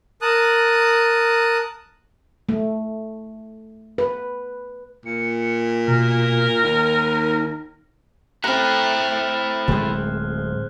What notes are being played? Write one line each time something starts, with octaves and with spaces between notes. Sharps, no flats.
A#4 A5 D#6 F#6
A3
B4
A#2 C#7
B2 A#4
D#2 D#4
A3 C4 E4 A#5 F6 F#6
D1 A2 G#3 G#4 C5